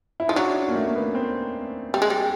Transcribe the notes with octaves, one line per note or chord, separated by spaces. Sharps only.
E4
F3 D#4
F#3 D4
C#4
A#3
A3
A#3
B3
C4
G3
G#3
G3